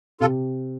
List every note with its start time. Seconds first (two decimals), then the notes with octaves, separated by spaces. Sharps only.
0.20 C3 F4 A4